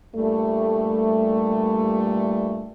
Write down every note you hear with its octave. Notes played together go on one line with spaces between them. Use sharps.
G2 A#2 G3 A3